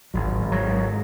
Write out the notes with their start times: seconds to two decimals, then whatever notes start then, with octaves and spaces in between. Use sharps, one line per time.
0.14 G#1 F#3
0.40 G#1
0.52 F#3
0.64 G#2